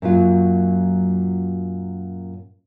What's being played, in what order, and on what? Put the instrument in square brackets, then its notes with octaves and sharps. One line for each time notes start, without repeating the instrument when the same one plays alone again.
[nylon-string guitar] F#2 A#2 F#3 F4